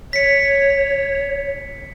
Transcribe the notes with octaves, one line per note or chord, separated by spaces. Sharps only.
C#5 B6 C#7